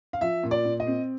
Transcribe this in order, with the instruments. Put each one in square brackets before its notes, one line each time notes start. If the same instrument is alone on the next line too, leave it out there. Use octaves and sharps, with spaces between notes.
[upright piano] F5
F3 E5
A#2
D5
A#2
D#5
C4